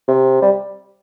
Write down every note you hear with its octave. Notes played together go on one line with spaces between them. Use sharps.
C3
G3